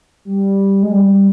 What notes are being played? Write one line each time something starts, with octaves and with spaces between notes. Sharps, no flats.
G3
G#3
G3